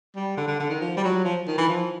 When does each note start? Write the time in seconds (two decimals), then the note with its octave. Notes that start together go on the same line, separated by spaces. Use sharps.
0.16 G3
0.37 D3
0.48 D3
0.60 D3
0.70 D#3
0.81 F3
0.97 G3
1.04 F#3
1.25 F3
1.47 D#3
1.58 E3
1.69 F3